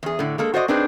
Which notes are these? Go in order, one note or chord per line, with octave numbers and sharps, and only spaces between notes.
E2 G#4
A2 D3
G#3 A#3 A4
F#4 C5 D5 D#5
C4 D4 D#4 G#4 B4 C5